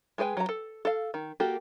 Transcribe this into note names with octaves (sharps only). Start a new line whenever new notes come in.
G#3 G#4 B4 G5 G#5
F#3 A#5
A4
A4 F5
D#3
A#3 F#4 G4 A4